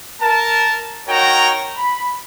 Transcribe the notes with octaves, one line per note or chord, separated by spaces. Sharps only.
A#4 A5
D#4 F#4 A#4 C#5 G5 A#5
B5